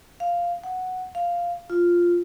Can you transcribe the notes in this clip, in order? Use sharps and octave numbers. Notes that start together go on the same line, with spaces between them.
F5
F#5
F5
F4